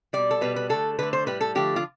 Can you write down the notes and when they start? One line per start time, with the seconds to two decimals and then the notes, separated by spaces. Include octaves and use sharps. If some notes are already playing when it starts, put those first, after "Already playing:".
0.13 B2 G3 D5
0.31 A4
0.41 B2 G3 B4
0.56 B4
0.69 D3 A3 A4
0.99 D3 A3 B4
1.13 C5
1.26 A2 G3 B4
1.41 A4
1.55 D3 F3 A3 G4
1.76 F4